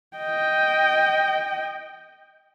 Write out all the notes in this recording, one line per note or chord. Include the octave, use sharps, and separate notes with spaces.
D#5 G5